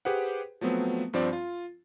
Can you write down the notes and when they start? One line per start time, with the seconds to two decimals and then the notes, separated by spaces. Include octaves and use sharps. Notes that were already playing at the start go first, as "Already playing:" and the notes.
0.05 G4 G#4 B4 C5 F#5
0.61 F3 F#3 A3 B3 C4
1.13 G2 F3 C4 D5
1.33 F4